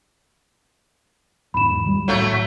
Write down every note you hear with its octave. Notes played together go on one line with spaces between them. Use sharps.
E2 G#2 D#3 B5 E7
F1 G3
C2 A2 F#3 A3